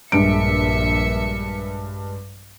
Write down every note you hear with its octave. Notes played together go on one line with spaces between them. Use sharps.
A#1 G2 G#3 E5 C#7 D7